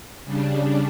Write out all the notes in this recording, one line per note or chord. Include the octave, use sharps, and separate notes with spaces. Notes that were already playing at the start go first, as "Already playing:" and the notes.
C#3 G3 D4